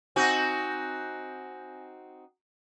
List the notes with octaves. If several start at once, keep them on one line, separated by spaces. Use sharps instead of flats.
C4 D#4 F#4 G#5 G6 A#6